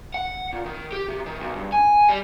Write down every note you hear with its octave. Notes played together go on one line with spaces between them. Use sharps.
F#5
A#2
D#3
G4
C3
D#3
B1
G2
G#5
G3